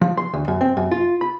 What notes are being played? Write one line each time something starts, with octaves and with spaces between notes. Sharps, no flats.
F3
C6
D2
F#2
C4
F#2
F4
B5